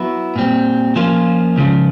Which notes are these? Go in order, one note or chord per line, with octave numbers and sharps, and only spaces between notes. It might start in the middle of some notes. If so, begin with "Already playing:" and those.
Already playing: F#3 B3 E4
A#2 G3 C4
F3 A#3 C#4 F4
C#2 C#3 F3